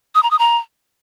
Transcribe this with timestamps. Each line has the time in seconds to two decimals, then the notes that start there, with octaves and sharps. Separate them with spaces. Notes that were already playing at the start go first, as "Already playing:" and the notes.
0.15 D#6
0.23 A#5
0.31 D#6
0.39 A#5